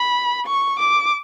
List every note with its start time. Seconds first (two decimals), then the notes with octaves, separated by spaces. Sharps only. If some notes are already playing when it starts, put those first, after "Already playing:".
Already playing: B5
0.46 C#6
0.79 D6